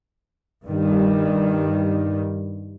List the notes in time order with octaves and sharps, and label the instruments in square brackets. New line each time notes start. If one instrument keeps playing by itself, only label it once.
[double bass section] G2 D#3 G3